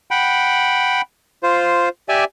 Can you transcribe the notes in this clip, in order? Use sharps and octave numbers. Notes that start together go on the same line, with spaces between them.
F#5 G5 B5
F4 C5
G4 D5 E5 G#5